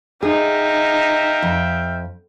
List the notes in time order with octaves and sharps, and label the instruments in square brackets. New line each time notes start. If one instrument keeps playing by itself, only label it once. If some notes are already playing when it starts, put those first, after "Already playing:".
[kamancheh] D#4 [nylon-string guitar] G#4 [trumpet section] E5 F5 G5
[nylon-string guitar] F2